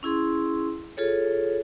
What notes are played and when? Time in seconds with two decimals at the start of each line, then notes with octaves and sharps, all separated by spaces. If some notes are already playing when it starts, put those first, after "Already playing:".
0.03 C#4 E4 G#4 C6
0.97 F4 G#4 A4 C#5